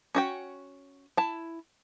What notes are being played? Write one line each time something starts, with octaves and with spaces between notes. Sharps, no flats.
C#4 F#4 G5
E4 A5